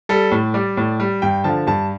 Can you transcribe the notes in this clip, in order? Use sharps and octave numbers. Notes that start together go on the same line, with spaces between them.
G3 A4
A2
G3 D5
A2
G3
G2 G5
D3 F3 A5
G2 A5